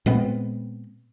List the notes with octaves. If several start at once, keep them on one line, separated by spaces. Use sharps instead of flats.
A#2 G#3 B3 C4